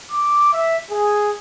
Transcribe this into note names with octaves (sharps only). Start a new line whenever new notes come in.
D6
E5
G#4